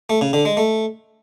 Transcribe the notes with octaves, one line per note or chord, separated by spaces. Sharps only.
A3
C#3
D3
G#3
A3